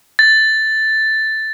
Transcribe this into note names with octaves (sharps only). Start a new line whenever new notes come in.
A6